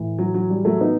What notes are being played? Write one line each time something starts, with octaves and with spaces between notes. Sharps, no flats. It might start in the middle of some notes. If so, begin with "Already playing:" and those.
Already playing: A2 E3
F#3
F#3
G3
F#3 A3
B3 D#4